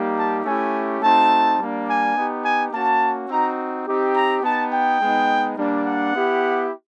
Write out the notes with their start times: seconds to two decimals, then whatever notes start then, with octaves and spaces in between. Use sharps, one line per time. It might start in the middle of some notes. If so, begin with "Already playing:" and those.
Already playing: G3 A#3 D#4 G4
0.16 A5
0.44 A3 C#4 E4 G4 G#5
1.01 A3 C4 D#4 F#4 A5
1.59 G3 A#3 D4
1.87 G#5
2.16 B3 D#4 G4
2.43 G#5
2.72 A#3 C#4 F#4 A5
3.29 C4 D#4 F#4 A#5
3.86 C4 D#4 G4
4.16 A#5
4.43 B3 D#4 G4 A5
4.72 G5
5.01 G#3 B3 D#4
5.57 G3 A#3 D4
5.86 F#5
6.14 B3 E4 G4